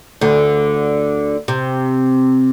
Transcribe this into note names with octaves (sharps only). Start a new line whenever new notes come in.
D2 D3
C3